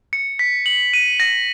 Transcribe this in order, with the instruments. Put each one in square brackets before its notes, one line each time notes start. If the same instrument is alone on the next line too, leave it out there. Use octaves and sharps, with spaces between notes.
[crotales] C#7
B6
F#7
D#7
A#6